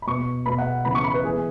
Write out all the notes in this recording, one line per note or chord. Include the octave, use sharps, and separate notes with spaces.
B5
B2 B3 C#6
B2 B3 B5
F#5
C#3 E3 B3 B5
C#6
B5
B4
E3 B3 G#4